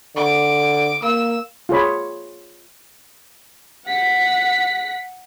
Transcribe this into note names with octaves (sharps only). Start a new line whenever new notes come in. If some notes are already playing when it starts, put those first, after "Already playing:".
D3 D6
A#3 E6
F4 G#4 C#5 B5
F#5 B6